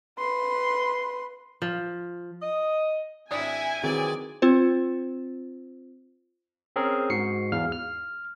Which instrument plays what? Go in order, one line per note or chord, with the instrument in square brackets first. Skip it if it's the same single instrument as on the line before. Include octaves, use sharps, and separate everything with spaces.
[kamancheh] B4 C6
[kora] F3
[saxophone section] D#5
[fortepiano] G#1 D4 D#6 [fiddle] E4 [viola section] G#5
[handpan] D#3 C4 G#4 [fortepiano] E3 F#3 [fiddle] D5
[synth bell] C4 F4 C5
[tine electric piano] C4 C#4 G#4 A#4
G#2 F#4 C7 C#7
E2 F5 F6
F6